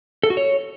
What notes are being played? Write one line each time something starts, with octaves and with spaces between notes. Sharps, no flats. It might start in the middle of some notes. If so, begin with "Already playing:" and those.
A4
F#4
C#5